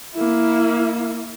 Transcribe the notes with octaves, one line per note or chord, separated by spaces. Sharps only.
A#3 E4